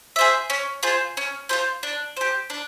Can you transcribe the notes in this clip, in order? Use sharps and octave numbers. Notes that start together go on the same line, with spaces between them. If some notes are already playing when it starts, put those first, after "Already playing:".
G#4 C5 E5
C#4
F4 G#4 C5
C#4
F4 G#4 C5
D4
G4 C5
D4